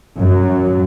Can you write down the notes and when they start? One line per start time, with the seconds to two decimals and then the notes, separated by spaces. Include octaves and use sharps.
0.17 F#2 F#3